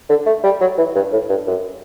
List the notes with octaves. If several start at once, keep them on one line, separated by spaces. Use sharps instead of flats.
D3
A3
G3
F#3
E3
G2
A2
G2
F#2